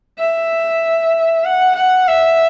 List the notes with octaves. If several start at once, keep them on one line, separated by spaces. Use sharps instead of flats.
E5
F#5
F#5
E5